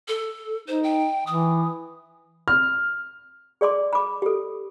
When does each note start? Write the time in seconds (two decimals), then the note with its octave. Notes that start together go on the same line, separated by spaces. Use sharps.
0.08 A4
0.68 D#4 C5
0.83 G5
1.27 E3 D#6
2.48 F6
3.61 G#4 D5 C6 D6
3.93 B5 D6
4.22 G4 A4